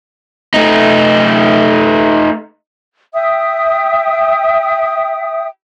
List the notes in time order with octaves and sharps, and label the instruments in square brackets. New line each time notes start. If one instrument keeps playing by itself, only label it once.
[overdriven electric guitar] A3 D#4
[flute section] E5 G5 D#6